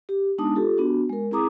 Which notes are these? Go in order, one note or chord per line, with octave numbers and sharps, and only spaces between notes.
G4
G#3 B3 D4 D#4 A5 D#6
F4 G4 A4
B3 D4 F#4
G#3 A#4
C4 E4 G#4 A#5 D6 D#6